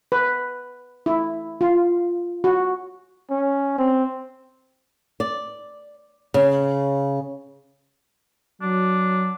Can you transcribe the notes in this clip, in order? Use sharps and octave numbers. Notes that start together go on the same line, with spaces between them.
B4
E4
F4
F#4
C#4
C4
D5
C#3
F#3 D4